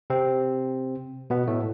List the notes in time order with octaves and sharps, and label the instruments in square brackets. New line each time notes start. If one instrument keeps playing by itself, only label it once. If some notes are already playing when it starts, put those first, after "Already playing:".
[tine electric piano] C3 C4
B2 B3
A2 A3